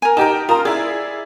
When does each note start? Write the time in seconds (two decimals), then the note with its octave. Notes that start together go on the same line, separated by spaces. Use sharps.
0.02 A#4 G#5
0.17 D#4 G4 A#4 A5
0.49 F4 A#4 C5 A#5 D#6
0.65 E4 G#4 D5